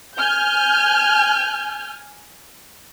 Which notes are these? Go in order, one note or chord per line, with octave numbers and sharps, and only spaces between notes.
G#5 F6 G6